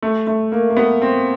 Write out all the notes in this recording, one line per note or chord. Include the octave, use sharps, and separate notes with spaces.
A3
A3
A#3
A#3
B3
C4